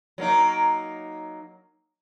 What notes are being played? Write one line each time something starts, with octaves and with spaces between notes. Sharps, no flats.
F#3 A#3 D#4